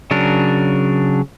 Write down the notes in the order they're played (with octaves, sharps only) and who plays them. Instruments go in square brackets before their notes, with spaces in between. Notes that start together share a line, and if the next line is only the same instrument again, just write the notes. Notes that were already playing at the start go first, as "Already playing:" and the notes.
[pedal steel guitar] C#3 F#3 D4 A#4